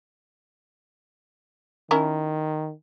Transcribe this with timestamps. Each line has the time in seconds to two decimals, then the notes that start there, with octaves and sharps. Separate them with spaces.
1.91 D#3 C#4 E4 A#4